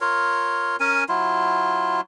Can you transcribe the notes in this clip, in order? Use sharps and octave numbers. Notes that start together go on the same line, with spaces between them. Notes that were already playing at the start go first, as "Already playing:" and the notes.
F4 A#4 C#5
C#4 A#4 G#5
F#3 E4 F4